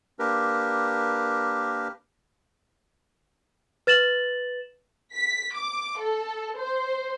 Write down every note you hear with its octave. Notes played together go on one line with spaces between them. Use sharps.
A#3 D4 G4 A#4 B4
B4 A6 E7 F#7
B6
D6
A4
C5